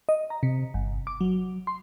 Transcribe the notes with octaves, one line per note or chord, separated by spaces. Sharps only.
D#5
A#5
C3
G1
D6
F#3
C6